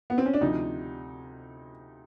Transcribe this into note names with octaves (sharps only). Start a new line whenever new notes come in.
B3
C4
C#4
D4
D2 C3 F3 D#4